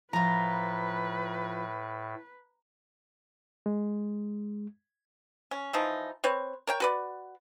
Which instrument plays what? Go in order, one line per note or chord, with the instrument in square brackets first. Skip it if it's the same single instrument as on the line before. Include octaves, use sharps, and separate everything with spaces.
[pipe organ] A2 [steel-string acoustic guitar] F3 F4 [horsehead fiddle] B4 [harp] A#5
[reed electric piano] G#3
[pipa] C#4
E3 F3 D#4
C4 B4 C#5
A#4 C#5 G5
F#4 B4 D5